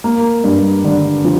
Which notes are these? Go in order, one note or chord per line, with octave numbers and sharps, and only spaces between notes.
A#3
G2
D3
F3